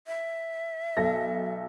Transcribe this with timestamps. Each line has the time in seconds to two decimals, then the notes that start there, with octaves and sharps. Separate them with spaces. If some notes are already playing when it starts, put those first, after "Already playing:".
0.07 E5
0.97 B1 A4 A#6